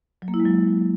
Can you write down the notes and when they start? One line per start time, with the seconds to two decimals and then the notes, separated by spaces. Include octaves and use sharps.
0.22 F#3
0.28 A#3
0.34 E4
0.40 G#3
0.45 F#3